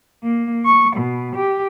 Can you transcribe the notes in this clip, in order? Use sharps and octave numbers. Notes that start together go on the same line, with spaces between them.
A#3
C#6
B2
G4